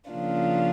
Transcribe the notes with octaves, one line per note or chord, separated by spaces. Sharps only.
C#3 F3 A#3 D4 F4